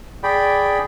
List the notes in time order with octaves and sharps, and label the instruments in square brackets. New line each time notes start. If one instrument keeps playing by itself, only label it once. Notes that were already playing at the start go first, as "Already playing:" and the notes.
[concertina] G#4 D5 G5 B5